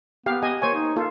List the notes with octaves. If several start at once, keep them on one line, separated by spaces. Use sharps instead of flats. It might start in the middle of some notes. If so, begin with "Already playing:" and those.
B3 G4 F5
G4 D#5 G#5
A#3 C5 C#5 G#5
D#4
A#3 F4 A4